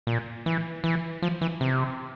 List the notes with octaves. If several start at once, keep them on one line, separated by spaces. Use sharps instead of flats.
A#2
E3
E3
F3
E3
C3